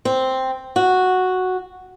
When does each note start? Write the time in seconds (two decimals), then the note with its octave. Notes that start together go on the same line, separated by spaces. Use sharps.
0.05 C4
0.76 F#4